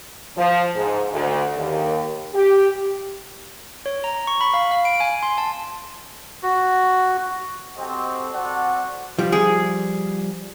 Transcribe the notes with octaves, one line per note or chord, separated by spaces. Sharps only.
F3
G#2
D2
D#2
G4
C#5
A#5
C#6
B5
F5
F5
D7
G#5
C6
A5
F#4
C4 F#4 G4 A4 C5 D#5
C4 F#4 A4 D5 F#5
F3 G3
G#4